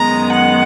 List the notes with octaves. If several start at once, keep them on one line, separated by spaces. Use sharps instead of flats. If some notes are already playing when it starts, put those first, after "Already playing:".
Already playing: F#2 D#3 G#3 B3 A#5
F#5